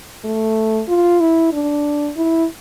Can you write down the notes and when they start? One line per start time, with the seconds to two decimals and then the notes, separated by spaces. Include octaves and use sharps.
0.24 A3
0.88 F4
1.20 E4
1.52 D4
2.16 E4